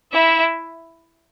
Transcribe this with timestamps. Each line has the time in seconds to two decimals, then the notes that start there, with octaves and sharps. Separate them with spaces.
0.12 E4 E5